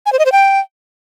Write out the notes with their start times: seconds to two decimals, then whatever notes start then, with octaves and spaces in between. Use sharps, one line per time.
0.06 G#5
0.12 C5
0.19 D#5
0.26 C5
0.32 G5